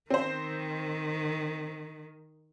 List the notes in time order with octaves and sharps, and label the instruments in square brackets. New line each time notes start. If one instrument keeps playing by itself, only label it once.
[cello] D#3 [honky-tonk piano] C4 C5